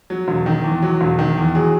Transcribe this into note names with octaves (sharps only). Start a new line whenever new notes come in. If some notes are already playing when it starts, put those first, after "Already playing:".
F#3
E1
D#3
E2
F#3
E1
D#3
E2
F#3 G#4